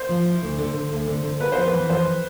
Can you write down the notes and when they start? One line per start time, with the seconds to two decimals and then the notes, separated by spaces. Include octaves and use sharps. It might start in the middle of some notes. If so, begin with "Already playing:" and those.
Already playing: C5
0.09 F3
0.25 E4
0.42 D2
0.58 D3
0.74 D3
0.91 D2
1.07 D3
1.23 D3
1.40 B3 B4
1.52 F2 C5
1.64 B4
1.73 E3
1.89 F2 C5